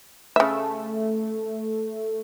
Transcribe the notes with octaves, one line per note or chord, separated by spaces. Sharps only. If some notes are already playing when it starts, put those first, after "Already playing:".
C#3 A3 E5